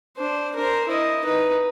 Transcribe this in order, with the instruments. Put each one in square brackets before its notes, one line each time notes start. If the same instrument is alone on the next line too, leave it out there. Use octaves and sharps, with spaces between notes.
[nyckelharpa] D4 C5
A#4 C5
E4 D#5
D#4 B4